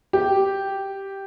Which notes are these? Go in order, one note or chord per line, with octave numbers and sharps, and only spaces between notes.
G4